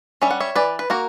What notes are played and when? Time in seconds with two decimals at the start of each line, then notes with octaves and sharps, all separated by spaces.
0.22 G3 C#4 E5
0.31 F#5
0.40 C#5 E5
0.55 E3 B4 D5
0.79 B4
0.90 A#3 F#4 A#4